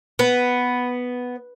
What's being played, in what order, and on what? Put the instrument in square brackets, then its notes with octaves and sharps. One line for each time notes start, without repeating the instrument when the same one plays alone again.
[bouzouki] B3